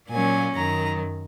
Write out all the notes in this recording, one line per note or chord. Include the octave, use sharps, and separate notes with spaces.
A#2 F#3 A#3 C#4 G#5
F#2 D#3 F#3 A#5